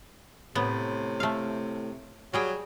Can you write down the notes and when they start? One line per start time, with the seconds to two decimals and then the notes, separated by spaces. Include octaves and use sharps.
0.55 A2 C3 B3
1.20 A3 F5
2.33 F#3 G3 G#4 G5